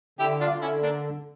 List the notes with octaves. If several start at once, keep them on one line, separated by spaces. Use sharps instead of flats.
D3 E4 G4
D4 F4
D3
C#4 E4
A#3 D4